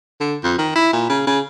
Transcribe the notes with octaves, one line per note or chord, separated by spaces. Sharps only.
D3
F2
D#3
E4
A#2
C#3
C#3